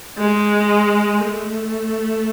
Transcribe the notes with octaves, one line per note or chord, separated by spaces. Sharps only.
G#3
A3